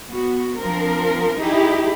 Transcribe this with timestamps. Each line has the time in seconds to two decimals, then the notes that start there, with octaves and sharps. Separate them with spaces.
0.10 B3 F#4
0.58 F3 C4 D4 A#4
1.41 D#4 E4 G4 G#4